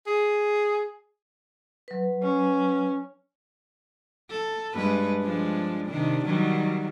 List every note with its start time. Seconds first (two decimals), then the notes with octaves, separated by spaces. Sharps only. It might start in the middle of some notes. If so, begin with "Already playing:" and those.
0.07 G#4
1.88 F#3 B4
2.23 C#4
4.30 A4
4.74 G2 G#3 B4
5.22 F3 G#3 D4
5.87 C3 D#3 D4
6.25 D#3 F#3 G3